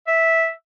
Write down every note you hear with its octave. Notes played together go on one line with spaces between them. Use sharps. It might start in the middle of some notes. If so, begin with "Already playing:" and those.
E5